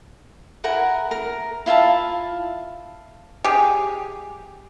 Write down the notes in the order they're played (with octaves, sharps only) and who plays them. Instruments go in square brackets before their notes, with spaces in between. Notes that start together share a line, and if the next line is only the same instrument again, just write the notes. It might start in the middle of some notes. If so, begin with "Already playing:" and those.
[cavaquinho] E4 A#4 F#5 G#5
A#4
E4 F4 E5 A5
[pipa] G4 G#4